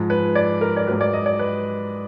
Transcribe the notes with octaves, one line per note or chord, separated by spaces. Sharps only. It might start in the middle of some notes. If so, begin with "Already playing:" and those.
Already playing: G#2 F3
B4
D5
A#4
D5
G#2 F#3 B4
D5
D#5
D5
B4